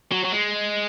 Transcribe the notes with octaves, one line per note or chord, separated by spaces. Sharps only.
F#3
F#3
G#3